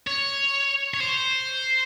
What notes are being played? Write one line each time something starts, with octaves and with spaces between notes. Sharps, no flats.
C#5
C#5
C5